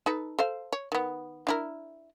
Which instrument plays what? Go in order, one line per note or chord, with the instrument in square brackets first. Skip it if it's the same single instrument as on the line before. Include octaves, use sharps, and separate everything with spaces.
[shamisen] D#4 A4 B4
A4 C5 F5
C#5
D#3 B3
D4 E4 A#4